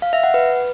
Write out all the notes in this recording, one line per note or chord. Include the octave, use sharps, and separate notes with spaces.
F5
E5
F#5
B4